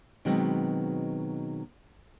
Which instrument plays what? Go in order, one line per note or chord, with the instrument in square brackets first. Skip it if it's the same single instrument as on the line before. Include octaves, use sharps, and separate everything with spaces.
[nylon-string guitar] B2 D#3 F#3 G#3 B3 C4